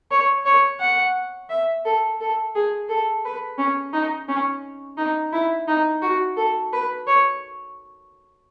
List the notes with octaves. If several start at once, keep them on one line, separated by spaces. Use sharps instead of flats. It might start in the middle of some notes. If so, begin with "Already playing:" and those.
C#5
C#5
F#5
E5
A4
A4
G#4
A4
B4
C#4
D#4
C#4
D#4
E4
D#4
F#4
A4
B4
C#5